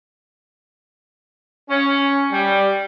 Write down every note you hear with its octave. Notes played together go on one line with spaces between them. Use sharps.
C#4
G3